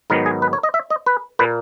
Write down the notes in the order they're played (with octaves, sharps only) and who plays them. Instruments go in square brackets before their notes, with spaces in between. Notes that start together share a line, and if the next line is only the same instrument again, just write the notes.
[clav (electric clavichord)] G#2 D#3 F#3 B3 A#4
G#4
B4
C#5
D#5
E5
D#5
B4
A#2 A#3 B4